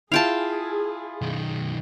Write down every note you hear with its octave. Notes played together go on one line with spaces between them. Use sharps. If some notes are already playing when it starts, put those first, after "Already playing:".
E4 F4 G#4 F5 G5 A5
B1 D#3